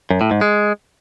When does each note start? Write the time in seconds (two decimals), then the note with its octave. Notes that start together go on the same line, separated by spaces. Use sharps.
0.10 F#2
0.21 A2
0.31 G#2
0.41 G#3